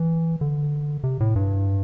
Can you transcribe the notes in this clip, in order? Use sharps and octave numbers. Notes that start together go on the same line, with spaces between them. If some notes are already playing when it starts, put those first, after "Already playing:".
Already playing: E3
D3
C3
A2
G2